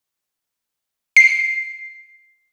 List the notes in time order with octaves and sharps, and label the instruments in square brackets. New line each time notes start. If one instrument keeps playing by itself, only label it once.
[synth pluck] C7